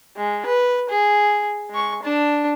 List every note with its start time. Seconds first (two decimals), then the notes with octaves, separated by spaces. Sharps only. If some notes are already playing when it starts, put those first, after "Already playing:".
0.17 G#3
0.46 B4
0.90 G#4
1.70 G#3 C#6
2.03 D4 A5